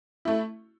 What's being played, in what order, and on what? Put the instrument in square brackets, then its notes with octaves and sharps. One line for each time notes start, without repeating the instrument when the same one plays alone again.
[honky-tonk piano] A3 E4